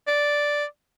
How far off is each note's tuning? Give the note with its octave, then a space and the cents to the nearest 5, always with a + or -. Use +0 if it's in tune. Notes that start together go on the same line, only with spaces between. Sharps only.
D5 -5